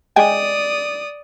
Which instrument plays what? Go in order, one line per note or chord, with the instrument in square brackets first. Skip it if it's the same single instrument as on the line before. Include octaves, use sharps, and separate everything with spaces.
[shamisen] G#3 G5 G#5 [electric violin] D5 D#6